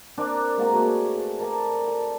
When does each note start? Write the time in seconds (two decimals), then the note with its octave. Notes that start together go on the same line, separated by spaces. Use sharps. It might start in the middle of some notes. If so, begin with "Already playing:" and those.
0.17 C4 D4 A#4 D5
0.57 G#3 A#3 F#4 A#4
0.71 A3 G#4 B4
1.39 A#4 D5 A5
1.87 A4